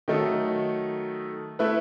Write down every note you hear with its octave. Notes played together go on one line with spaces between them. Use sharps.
D#3 F#3 A3 D#4 A4
A3 E4 B4